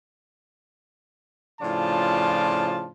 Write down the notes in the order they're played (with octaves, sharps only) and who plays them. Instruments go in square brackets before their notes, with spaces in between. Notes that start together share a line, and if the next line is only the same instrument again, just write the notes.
[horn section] A2 C#3 F3 D4 F4 A5